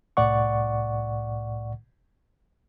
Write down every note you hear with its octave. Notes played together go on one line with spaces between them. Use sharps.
C2 A2 D5 F#5 C#6